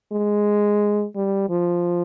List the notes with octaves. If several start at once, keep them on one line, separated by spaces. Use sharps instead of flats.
G#3
G3
F3